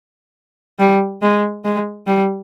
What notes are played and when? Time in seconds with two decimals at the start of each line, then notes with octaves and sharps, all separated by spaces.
0.79 G3
1.22 G#3
1.64 G#3
2.07 G3